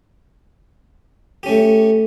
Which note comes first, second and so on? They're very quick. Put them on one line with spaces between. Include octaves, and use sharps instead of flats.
G4 C#4 A3